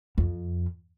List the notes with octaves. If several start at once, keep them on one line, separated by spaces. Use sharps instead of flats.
F2